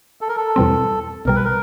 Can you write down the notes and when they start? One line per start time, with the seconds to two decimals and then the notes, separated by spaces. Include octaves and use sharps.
0.21 A4
0.29 A#4
0.37 A4
0.56 E2 B2 G3 C4
1.25 B1 B2 G3 A#4
1.35 B4
1.44 A#4